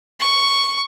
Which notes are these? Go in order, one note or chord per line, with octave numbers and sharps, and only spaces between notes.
C#6